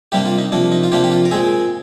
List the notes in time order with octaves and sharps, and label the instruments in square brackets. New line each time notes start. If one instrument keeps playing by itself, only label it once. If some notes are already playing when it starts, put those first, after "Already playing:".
[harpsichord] C3 G3 A#3 D4 G4
F4
D#4
C3 F3 A#3 D4
D#4
F4
C3 F3 A#3 D4 G4
G4
F4
A#4
A#2 G#3 C4 G#4